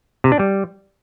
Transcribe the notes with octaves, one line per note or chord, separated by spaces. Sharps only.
C3
D4
G3